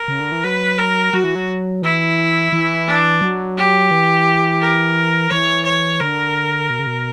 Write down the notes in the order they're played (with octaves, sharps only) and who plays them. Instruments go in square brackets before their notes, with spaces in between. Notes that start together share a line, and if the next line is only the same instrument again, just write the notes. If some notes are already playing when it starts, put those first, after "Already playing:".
Already playing: [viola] A#4
[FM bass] C#3
D3
E3
[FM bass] F#3 [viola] B4
[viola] A#4
[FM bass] F#3 [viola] F#4
[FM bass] E3
F#3
[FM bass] E3 [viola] E4
[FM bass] E3
[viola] D4
[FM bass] F#3
[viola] G4
[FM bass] E3
[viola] A#4
[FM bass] E3 [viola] C#5
[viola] C#5
[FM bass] D3 [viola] A#4
[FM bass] B2
C#3
B2